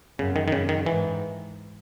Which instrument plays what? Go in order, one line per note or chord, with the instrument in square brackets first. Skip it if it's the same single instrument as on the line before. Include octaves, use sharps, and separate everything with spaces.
[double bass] F#2 [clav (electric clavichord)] C#3
[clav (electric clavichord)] D#3
D#3
[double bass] F#2 [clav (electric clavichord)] C#3
[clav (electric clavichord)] D#3
[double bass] G#2 [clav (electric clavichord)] E3